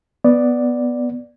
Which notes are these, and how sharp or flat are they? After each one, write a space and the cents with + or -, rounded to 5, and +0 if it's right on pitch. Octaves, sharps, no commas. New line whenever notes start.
B3 +0 D5 +0